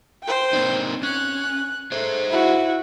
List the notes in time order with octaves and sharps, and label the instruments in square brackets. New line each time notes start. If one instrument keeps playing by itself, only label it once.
[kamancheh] C5 G5
[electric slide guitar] A#3 C4 D#4
[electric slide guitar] C#4 [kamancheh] F#6
[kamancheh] A3 [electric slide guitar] G#4 C5
[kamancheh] E4 F#4